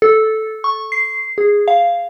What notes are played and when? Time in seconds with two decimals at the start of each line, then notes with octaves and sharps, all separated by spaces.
0.02 A4
0.64 C#6
0.92 C7
1.38 G#4
1.68 F5